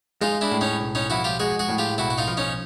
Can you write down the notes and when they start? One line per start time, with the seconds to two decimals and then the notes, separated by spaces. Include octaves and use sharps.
0.22 G#3 D#4 F4
0.41 D4 E4
0.51 A2
0.61 C#4 D#4
0.81 B1
0.95 C#4 D#4
1.10 F3 E4 F#4
1.24 F4 G4
1.40 G#3 F#4 G#4
1.59 F#4 G#4
1.69 A2
1.78 F4 G4
1.98 B1 E4 F#4
2.10 F#4
2.18 D#4 F4
2.28 F3
2.37 C#4 D#4